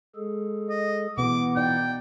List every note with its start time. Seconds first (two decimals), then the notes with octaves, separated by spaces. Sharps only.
0.16 G#3 G#4 A4
0.70 D#5
1.18 B2 E3 B3 E4 F#5 D6
1.56 D#4 D5 G5